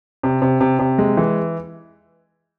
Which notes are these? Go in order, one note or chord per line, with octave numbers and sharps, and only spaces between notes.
C3
C3
C3
C3
G#3
E3